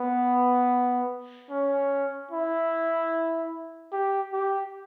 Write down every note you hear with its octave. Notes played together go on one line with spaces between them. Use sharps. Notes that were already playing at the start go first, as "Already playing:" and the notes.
Already playing: B3
C#4
E4
G4
G4